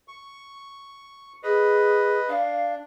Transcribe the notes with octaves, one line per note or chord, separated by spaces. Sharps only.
C#6
G#4 B4 D#5
D4 F5